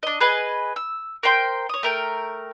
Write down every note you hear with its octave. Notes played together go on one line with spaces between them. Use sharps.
D4 D#5
G#4 B4 D#5 G#5
E6
A#4 C5 G5 C6
C#5 D#6
A3 A#4 G5